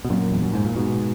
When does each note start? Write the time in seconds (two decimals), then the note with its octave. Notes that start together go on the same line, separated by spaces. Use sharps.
0.05 B2
0.10 F#2 A#2
0.32 E2
0.42 F#2
0.53 G#2
0.65 A#2
0.76 G#2 B2